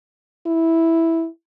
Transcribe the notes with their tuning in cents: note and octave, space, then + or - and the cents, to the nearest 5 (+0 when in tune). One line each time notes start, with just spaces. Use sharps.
E4 -5